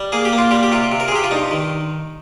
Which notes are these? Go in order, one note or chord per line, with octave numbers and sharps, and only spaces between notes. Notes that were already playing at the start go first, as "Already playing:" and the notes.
Already playing: G3
A#3 G#4
G4
A#3
F4
G3 G4
G4
C3 F4
C3
A#4
G#4
C3 G4
F4
G2 D#4
D#3